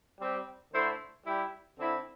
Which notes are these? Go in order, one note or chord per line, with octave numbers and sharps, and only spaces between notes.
G3 C4 G4
D3 A3 E4 C5
G3 E4 G4
D3 C4 E4